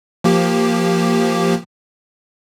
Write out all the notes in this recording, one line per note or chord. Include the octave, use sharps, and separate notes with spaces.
F3 A#3 G4